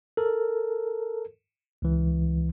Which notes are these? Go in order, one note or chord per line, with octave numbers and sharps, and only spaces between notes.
A4 A#4
C#2 E3